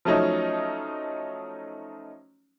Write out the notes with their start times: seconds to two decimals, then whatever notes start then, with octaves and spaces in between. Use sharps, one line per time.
0.05 F3 F#3 A3 C#4 D#4